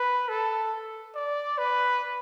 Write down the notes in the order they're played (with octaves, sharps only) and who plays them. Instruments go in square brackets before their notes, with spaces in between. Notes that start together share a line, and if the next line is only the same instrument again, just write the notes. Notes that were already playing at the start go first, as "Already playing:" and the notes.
Already playing: [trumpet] B4
A4
D5
B4